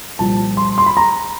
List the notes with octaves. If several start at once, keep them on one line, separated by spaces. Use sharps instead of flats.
C2 A#2 F3 A5
C6
C6
B5
A#5